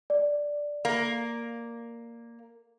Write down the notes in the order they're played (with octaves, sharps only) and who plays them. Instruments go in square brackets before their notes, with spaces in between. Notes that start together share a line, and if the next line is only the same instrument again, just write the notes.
[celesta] D5
[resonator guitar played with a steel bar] A#3